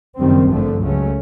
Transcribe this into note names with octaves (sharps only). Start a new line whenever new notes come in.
F#1 F#2 D#3 G3 C4
G#1 G2 D3 F3 A3
C#2 C#3 F#3 A3 C#4